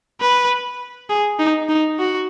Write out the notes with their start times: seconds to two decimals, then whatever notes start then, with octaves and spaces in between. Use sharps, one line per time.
0.21 B4
1.10 G#4
1.39 D#4
1.69 D#4
1.99 F#4